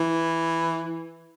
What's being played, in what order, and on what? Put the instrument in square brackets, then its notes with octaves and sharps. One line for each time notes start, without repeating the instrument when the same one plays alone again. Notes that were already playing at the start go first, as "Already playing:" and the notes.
Already playing: [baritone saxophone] E3